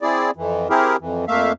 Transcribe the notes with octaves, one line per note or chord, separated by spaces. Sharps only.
C4 E4 G#4 D5
F2 E3
C4 E4 G4 G#4 A#4
F2 E3
F2 A3 A#3 E5 F5